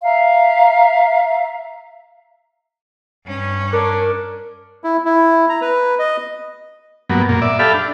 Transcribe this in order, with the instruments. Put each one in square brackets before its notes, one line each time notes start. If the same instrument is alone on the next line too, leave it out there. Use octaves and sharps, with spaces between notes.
[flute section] E5 F5 A#5
[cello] G2 C#4
[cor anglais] D4 [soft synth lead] A#4
[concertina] E4
E4
A#5
B4
D#5
[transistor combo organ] G2 F#3 A#3 B3
F#2 A#2 A#3
D5 E5
G4 A4 E5 F5 B5
D4